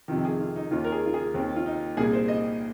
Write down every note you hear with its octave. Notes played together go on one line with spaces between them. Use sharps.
F2 C3 D#3 F4
G#4
F4
D#4
D#2 D#3 F4
A#4
G#4
F4
G#4
D#2 D#3 C4
F4
D#4
C2 A#2 G#4
C5
D#5